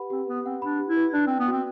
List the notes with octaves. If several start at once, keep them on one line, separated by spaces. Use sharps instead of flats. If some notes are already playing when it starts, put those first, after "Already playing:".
Already playing: G4 B4 F#5 B5
C4 G4
B3 B4
C4 F#5
D4 B5
G4
E4
B4
D4 D5
C4 G5
B3
C4 F#4